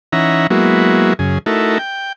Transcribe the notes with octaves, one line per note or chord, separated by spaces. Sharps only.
E3 C#4 D#4 E5 F#5 A#5
F#3 G#3 A#3 B3 E4 F#4
F#2 C#3 G#4
A3 D#4 E4 F#4 A4 A#4
G5